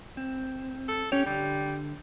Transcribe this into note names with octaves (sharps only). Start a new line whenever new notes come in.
C4
A4
C#4 G4 C#5
D3 G3